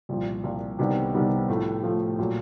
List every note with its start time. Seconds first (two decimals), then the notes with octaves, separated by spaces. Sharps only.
0.09 C2 A#2 F3
0.43 C2 A#2 F3
0.79 C2 C3 D#3 G3 B3
1.13 C2 C3 D#3 G3 B3
1.49 A2 F3 A3
1.83 A2 F3 A3
2.19 A#2 F#3 A3